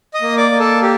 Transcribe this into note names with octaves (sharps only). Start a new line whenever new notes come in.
D#5 D#6
A#3
D5 D6
A#3
A4 A5
G4